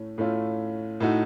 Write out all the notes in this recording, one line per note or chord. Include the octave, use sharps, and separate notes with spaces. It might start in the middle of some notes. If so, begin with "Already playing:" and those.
Already playing: A2 A3 C#4
A2 A3 C#4 F4
A2 A3 D#4 F#4